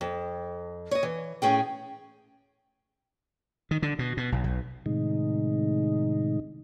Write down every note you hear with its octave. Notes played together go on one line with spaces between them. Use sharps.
F2
C#5 D#5
E3
A2 C#4 G#4 G5
D#3
D3
B2
B2
B1
B1
A2 C3 D#3 G#3 D#4